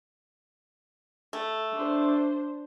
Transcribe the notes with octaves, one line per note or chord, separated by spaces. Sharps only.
A3
D4 C5